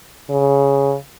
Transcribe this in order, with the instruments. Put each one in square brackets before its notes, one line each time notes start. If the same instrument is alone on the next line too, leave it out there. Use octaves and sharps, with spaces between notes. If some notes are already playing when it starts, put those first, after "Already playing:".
[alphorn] C#3